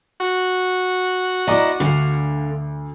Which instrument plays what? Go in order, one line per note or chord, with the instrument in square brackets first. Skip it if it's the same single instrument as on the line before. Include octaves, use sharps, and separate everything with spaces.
[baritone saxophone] F#4
[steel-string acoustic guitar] E4 D#5 [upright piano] D5 A#5 D6
[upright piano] D2 [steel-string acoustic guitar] D3 F5